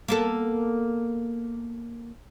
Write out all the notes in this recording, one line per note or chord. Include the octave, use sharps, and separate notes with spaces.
A#3 B3 A4